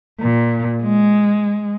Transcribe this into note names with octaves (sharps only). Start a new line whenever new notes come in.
A#2
G#3